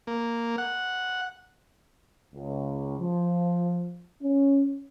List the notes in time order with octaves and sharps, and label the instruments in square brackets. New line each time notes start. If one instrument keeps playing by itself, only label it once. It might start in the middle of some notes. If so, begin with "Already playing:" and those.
[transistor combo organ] A#3
F#5
[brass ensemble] C#2
F3
C#4